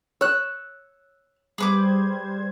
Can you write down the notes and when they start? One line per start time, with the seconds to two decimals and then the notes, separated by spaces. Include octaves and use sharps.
0.21 C#5 E6 F#6
1.58 G3 G#4 B4 C5 D6 G#6